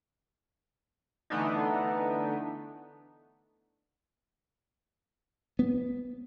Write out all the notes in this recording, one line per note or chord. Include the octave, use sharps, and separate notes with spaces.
D3 E3 A3 B3 D4 D#4
B3